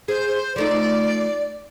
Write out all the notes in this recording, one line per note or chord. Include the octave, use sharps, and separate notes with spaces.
G#4 C5
F3 A3 D#4 D5